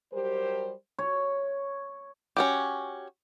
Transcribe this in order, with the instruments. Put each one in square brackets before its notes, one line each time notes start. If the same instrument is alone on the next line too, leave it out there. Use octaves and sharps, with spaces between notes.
[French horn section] F#3 G3 G4 A#4 C5
[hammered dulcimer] C#5
[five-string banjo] C#4 F#4 G4